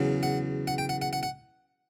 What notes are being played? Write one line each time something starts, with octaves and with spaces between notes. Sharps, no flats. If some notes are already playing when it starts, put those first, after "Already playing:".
Already playing: E2 C#3 F#3
F#5
F#5
G5
F#5
F#5
F#5
F#5